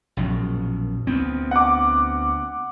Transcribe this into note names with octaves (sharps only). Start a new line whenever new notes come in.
A#1 F#2 B2
D2 B3 C4
F#5 D6